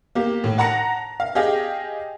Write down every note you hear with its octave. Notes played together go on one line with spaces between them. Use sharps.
A#3 G4
A2
F#5 A5 A#5 A#6 C#7
F5
G4 G#4 D#5 F5 G5